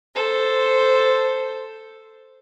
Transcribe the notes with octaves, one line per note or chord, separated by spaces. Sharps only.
A4 C5